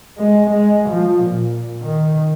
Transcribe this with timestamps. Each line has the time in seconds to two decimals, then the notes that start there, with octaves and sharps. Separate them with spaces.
0.18 G#3
0.50 G#3
0.90 F3
1.23 A#2
1.82 D#3